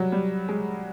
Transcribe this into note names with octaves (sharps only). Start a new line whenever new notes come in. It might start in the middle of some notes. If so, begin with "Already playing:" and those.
Already playing: F#3 G3
G3
G#3